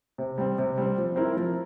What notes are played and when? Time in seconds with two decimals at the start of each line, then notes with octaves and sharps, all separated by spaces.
0.18 C3
0.38 G3 C4
0.58 C3
0.78 G3 C4
0.98 F3
1.16 C4 E4 A#4
1.37 F3